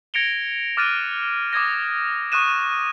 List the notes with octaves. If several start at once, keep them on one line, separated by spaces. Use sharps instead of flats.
G#6 A#6 C#7 D7 F7 G7
D6 F6 F#6 A6 D7 D#7
D6 D#6 G#6 A#6
C#6 D#6 F#6 D#7 E7